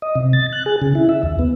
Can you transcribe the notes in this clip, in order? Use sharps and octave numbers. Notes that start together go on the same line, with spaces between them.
D#5
C3
A6
F#6
G#4
C#3
E4
E5
D#2
B3